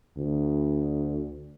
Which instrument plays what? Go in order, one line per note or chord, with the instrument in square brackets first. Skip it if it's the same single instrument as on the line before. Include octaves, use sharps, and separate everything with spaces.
[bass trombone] D2